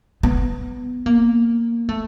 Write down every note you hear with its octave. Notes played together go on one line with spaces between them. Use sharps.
B3
A#3
A3